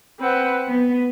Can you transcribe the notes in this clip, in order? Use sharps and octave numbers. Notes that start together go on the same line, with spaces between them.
C4 B4 F#5
B3